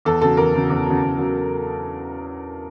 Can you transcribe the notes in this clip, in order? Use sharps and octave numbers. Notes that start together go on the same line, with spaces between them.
E2 A4
C#3 F#3 A4
E2 A#4
C#3 F#3
E2
C#3 F#3
E2
C#3 F#3